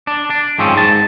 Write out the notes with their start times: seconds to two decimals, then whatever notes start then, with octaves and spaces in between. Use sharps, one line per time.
0.07 D4
0.30 D4
0.59 G#2 F3 C4 C#4
0.75 G#2 A5